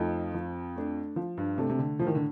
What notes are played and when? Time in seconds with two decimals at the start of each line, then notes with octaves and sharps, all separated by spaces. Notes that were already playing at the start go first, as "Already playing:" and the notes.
Already playing: F2 F3 A3 D#4
0.34 F3
0.76 A3 D4
1.16 F3
1.37 G2
1.58 C3 A3 D4
1.70 C3
1.79 D3
1.99 A2 F3
2.07 D#3
2.15 D3